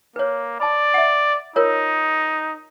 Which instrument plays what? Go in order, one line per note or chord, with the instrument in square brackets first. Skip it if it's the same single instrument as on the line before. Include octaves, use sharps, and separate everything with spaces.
[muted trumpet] A#3 [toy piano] B4 C#5
[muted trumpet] D5 [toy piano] A5 B5
[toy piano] E5 F#5
[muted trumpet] D#4 [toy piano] F4 A#4 C#5